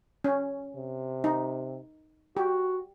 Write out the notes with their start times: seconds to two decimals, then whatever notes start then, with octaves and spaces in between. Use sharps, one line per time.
0.24 C#4
0.75 C3
1.24 D#4
2.37 F#4 G4